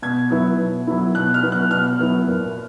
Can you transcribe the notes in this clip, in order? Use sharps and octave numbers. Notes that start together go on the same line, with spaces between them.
B2 G#6
F#3 B3 E4
B2
F#3 B3 E4
B2 F#6
F6
F#3 B3 E4
F#6
B2 F6
F#3 B3 E4
A#2